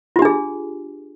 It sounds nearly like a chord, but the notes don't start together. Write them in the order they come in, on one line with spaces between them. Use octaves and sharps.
F4 G4 D4 G#4